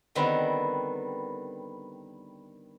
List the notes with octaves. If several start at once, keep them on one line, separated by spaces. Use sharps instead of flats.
D3 D#3 G3 B3 C4